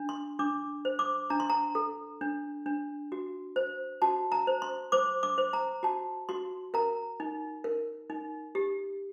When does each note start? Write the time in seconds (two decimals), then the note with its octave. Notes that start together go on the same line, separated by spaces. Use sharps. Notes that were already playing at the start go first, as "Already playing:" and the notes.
Already playing: D4
0.09 C6
0.39 D4 D6
0.85 C5
0.99 D6
1.30 D4 A#5
1.40 C6
1.50 A#5
1.75 A4
2.21 D4
2.66 D4
3.12 F#4
3.56 C5
4.02 F#4 A5
4.32 A#5
4.47 C5
4.62 C6
4.92 C5 D6
5.23 D6
5.38 C5
5.53 A#5
5.83 F#4 A5
6.29 F#4 C6
6.74 A#4 A#5
7.20 D#4
7.64 A#4
8.10 D#4
8.55 G4